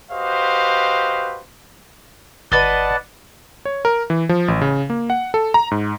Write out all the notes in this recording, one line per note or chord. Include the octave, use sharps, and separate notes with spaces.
F#4 G4 B4 C5 D#5 F5
G1 B4 D5 D#5 F#5 A5 A6
C#5
A#4
E3
F3
A1
C#3
A#3
F#5
A4
A#5
G#2